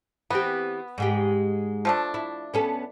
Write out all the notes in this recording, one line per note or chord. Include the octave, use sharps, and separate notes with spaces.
E3 B3 C4 G4
G#2 G#3 G4
F3 A3 D4
E4
B3 C#4 A4